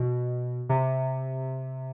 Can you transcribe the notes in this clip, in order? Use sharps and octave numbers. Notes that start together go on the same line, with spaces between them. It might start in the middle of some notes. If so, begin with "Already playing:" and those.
Already playing: B2
C3